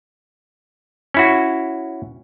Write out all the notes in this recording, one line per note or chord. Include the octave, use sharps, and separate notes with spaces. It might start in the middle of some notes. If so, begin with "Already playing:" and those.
C#4 E4 F#4